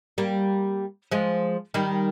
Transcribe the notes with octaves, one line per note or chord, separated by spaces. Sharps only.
G3 A#3
F3 G#3
D#3 G3